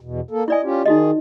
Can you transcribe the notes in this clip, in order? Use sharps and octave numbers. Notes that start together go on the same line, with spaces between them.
E2 B2
A#3 A4
E4 D5 D#5 G#5
C#4 F4 G4
D#3 D#4 F#4 G#4 D#5